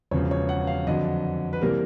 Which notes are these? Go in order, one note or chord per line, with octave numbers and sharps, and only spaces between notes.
E1 E2 C#3 F3 C#5
C#5
F#5
F5
F2 D3 F#3 D#5
B4
C3 E3 G3 A#3 A#4